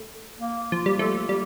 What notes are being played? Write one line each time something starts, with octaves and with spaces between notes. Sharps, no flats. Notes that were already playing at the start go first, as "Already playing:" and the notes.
Already playing: A3
A#3
F3
G3
F3 A3
G3